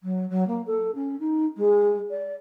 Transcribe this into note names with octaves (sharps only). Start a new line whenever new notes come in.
F#3
F#3
A#3
A4
C#4
D#4
G#3
D5